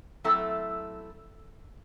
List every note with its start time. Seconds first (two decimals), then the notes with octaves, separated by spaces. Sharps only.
0.24 F#3 A3 C4 E4 A4